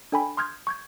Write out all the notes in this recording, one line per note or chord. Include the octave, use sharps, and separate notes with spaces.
D4 A4 G5 G#5 B5
C6 D#6 F6 G6 G#6
C#6 G6 G#6